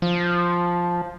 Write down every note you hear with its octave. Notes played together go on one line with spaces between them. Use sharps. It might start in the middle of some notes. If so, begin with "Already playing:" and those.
F3